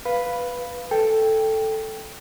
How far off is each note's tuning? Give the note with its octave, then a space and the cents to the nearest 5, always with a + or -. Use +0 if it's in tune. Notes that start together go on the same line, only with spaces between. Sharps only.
B4 +0 F5 +0 B5 +0
A4 +0 G5 +5